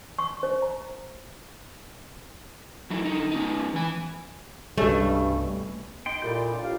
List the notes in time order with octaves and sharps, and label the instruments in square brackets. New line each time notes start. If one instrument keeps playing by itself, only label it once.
[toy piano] C#6
C5
A#5
[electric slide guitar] F#3 D#4 E4
D3 D#4
B3 C#4 D#4
E3 G#5
[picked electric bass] C2 G3 [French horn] G2 [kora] B2 C#4 [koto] A3
[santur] D#4 [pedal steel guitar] G5 C6
[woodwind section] A#2 [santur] G3 A3 E4 [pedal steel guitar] D5 G5
[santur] D4 F4 C#5
[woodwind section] D#2 F5